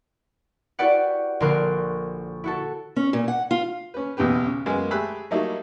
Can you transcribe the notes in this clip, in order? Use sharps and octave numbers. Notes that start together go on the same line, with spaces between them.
E4 F#4 G4 B4 D5 F#5
A#1 D3 A#4 C6 D6 F#6
E4 F#4 A4
C#4
A#2
F#5
F4
C#4 B4
B1 E2 C#3 G4 B4
C#3
F#2 G#3 A#3 B3 G#5
A3 G4 G#4 B5 E6 F#6
F#3 G3 A3 A#3 D#4 E4